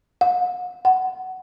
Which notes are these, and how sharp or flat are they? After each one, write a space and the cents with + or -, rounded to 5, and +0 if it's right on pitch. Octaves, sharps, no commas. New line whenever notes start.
F#5 -45
F#5 +15